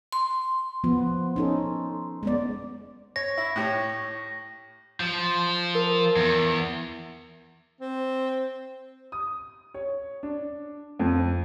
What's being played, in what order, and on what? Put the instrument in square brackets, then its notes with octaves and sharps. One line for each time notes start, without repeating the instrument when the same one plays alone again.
[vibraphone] C6
[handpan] F3 B3
C#4 D#4 A4
G#3 B3 D5
[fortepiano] C#5 [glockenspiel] A#6
[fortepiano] E4
A2 G4 C#5
[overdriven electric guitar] F3
[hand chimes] A#4
[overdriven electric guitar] E2
[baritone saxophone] C4
[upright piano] D#6
C#5
D4
F2